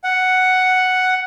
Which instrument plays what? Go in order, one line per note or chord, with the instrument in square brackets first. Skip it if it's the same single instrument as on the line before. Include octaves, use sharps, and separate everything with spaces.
[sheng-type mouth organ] F#5